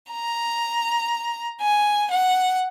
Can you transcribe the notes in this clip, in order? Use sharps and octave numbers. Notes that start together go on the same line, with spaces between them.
A#5
G#5
F#5